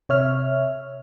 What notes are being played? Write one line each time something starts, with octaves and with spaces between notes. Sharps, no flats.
C3 C#5 E5 F6